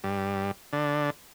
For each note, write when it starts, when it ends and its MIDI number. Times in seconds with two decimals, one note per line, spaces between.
0.04 0.51 43
0.73 1.10 50